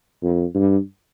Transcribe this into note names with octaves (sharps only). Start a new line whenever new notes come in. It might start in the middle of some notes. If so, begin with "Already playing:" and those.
F2
G2